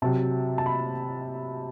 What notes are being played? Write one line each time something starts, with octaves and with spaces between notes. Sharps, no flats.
C3 F#3 A5
A5
B5